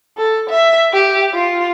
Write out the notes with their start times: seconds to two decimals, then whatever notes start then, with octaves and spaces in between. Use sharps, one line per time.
0.18 A4
0.49 E5
0.94 G4
1.34 F4